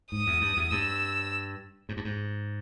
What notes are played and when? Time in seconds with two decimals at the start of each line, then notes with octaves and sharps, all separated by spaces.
0.12 G#2 D#6
0.27 E2
0.41 G2
0.57 E2
0.71 G2 E6
1.89 G#2
1.97 G2
2.05 G#2